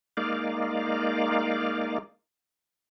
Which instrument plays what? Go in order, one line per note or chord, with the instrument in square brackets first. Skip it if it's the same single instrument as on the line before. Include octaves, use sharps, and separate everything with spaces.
[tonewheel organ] G#3 A#3 D#4 D5 F5